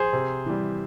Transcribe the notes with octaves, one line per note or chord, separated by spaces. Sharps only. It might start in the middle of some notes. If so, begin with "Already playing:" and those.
Already playing: G#4 C5
C3
E3 G3